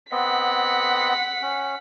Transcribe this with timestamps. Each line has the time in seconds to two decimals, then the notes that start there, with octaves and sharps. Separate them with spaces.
0.12 B3 C4 D#5 F#5 B6
1.42 C#4